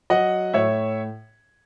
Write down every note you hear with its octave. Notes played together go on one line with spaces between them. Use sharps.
F#3 D#5 F#5
A2 C#5 E5